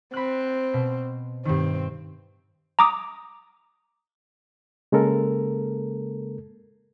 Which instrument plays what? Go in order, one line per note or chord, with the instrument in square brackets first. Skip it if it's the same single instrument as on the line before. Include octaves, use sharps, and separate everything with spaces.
[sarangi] C4 [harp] B5 F#6
[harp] B2
[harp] G2 D#3 [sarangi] C4
[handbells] A#5 D6 D#6
[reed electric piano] C#3 G#3 A#3 A4 A#4